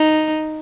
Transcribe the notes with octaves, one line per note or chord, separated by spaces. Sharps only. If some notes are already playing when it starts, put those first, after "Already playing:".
Already playing: D#4